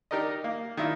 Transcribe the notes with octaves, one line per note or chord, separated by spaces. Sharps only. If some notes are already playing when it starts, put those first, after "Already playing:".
D4 D#4 G4 A#4 D5 D#5
A#3
D#3 D4 E4 F4